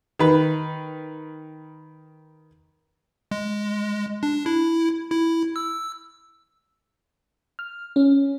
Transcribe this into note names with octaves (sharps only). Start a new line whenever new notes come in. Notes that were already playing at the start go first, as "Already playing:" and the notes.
D#3 B4
G#3
D4
E4
E4
E6
F6
C#4